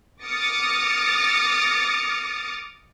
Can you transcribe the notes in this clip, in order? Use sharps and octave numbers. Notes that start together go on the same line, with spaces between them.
D6 D#6 F6 A6 A#6 C#7